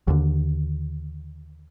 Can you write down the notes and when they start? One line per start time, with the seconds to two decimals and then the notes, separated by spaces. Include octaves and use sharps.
0.08 D#2 D3